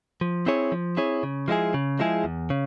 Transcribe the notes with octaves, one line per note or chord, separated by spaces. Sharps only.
F3
C4 E4 G#4 C#5
F3
C4 E4 G#4 C#5
C#3
F3 G#3 E4 G#4
C#3
F3 G#3 E4 G#4
E2
C#3